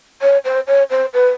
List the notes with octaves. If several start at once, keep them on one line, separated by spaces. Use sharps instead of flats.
C#5
C5
C#5
C5
B4